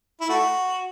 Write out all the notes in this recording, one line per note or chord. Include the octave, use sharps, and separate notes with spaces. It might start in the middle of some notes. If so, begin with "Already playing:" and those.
E4
A3 F#4